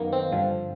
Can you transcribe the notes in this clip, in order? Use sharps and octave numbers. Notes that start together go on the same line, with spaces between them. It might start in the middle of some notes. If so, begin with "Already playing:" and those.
Already playing: F#2 D#3 A#3 B3
C4
G2 D3 F3